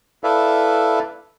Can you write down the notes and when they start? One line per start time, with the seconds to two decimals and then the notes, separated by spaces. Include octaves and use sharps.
0.24 E4 A4 B4 D5 E5 F5